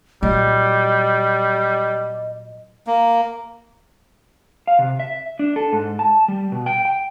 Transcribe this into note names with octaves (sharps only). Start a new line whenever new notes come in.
A#2 F#3 G3 D#5
A#3
F5
C3
E5
D4
A4
G#2
A5
G3
B2
G5
G5